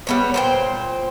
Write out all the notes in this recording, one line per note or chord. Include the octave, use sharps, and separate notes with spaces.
G3 B3 C#5
A#2 C5 G5